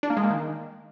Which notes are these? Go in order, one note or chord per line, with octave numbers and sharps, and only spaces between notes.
D4
A#3
G#3
A#3
D#3